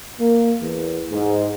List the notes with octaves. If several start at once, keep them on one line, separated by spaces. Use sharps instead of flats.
A#3
E2
G#2